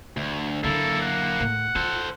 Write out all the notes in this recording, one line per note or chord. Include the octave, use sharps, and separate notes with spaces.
D2
D3 F#3 A#3 E4 A4
F#5
A2
F4 A4 C5